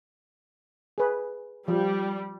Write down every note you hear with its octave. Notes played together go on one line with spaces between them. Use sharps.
G#4 B4
F3 G3